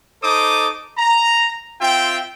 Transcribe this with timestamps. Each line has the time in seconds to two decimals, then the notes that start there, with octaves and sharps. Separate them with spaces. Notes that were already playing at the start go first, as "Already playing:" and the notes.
0.22 D#4 A4 C5 D6 D#6
0.98 A#5
1.81 C4 F4 E5 G5